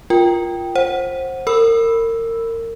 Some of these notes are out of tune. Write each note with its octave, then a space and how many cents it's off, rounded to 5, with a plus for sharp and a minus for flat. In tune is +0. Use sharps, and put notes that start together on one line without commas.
F4 +0 A#4 +10 G5 +0
C5 +25 F#5 +0
A#4 -30 B5 +0 E6 +0